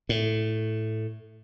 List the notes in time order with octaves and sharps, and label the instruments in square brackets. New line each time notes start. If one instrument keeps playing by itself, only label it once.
[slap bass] A2